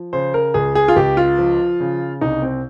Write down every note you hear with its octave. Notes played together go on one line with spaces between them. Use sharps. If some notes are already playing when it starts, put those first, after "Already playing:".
Already playing: F3
C#3 C5
A#4
C#2 G#4
G#4
F4
C#2 G4
F4
F3
C#3
C2 D#4
C4